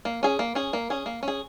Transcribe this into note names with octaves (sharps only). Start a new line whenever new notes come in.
A#3
C#4 G#4
A#3
C#4 G#4
A#3
C#4 G#4
A#3
C#4 G#4